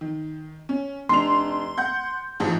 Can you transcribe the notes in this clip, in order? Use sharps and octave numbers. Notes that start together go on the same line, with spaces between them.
D#3
C#4
F1 D4 C6 F7
F#5 G6
A1 G#2 F3